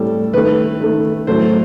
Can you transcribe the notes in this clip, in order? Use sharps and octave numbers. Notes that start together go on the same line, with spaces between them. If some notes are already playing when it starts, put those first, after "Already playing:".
Already playing: A2 G3 A4
D#3 A3 B4
D#3 A3
A2 F#3 A3 C5